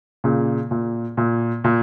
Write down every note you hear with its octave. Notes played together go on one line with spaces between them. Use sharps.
A#2 C#3
A#2
A#2
A#2